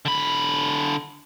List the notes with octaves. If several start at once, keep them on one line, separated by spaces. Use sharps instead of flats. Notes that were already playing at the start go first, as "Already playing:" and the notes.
D3 B5